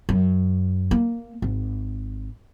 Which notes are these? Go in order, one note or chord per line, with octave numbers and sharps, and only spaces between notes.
F#2
A#3
G#1